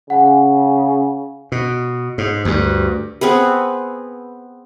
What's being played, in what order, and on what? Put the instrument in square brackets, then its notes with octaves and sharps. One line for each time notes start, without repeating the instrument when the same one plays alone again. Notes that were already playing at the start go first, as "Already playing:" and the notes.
[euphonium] C#3 [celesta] F#5 G#5
[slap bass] B2
G#2
D2 G2
[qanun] B3 C4 G#4 B4